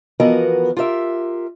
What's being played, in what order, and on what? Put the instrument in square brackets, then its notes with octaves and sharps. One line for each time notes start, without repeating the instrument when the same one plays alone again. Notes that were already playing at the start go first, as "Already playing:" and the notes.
[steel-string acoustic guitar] E3 F3 B3 F#4 A#4 D#5
F4 G4 A#4 E5